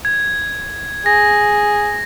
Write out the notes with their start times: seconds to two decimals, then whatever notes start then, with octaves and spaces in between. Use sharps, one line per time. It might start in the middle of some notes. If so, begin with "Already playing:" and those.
0.05 G#6
1.06 G#4 A#6